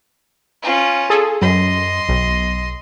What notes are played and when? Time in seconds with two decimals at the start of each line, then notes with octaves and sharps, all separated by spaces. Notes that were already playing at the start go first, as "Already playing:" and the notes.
0.62 C#4 F4
1.10 G#4 A4
1.41 F#2 D#5 C6
2.09 B1